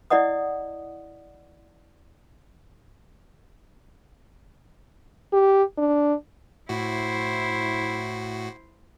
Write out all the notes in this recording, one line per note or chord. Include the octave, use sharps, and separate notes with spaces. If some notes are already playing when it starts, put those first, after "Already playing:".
E4 D5 D#5 F#5 D#6
G4
D4
A2 E4 F#4 C5